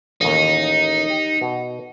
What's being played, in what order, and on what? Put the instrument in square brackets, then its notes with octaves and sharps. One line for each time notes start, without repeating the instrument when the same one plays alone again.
[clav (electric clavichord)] A1 D#2 [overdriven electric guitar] D#4
[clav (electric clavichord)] G4
B2